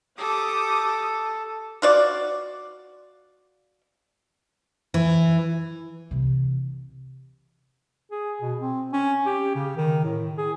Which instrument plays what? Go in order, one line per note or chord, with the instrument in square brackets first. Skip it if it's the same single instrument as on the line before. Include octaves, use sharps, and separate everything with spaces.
[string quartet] G4 D6 D#6 [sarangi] A4
[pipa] F4 F#4 D5
[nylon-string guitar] E3
[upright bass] C3 E3
[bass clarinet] G#4
B2
C4
C#4
G4
C#3
D#3
A2
G#4